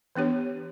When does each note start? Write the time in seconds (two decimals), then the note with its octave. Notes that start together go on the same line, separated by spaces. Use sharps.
0.15 E3 B3 D4 G4 C#5